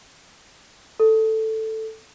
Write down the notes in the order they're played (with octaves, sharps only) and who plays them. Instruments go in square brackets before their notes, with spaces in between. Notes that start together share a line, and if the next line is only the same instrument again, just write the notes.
[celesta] A4